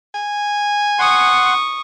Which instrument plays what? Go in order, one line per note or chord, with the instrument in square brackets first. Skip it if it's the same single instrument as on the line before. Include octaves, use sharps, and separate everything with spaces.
[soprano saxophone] G#5
[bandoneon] F#5 C6 [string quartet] C#6 D#6